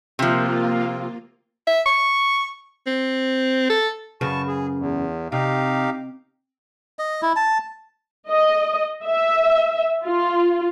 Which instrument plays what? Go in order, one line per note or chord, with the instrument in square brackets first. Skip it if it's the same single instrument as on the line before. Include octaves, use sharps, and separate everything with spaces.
[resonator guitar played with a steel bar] C3 F3 [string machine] A#3 F4
[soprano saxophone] E5
C#6
C4
A4
[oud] F#2 C#3 B4 [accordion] A5 C#6
[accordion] G#4
E2
[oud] C3 [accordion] D#4 G4 F5
[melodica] D#5
E4
A5
[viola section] D#5
E5
F4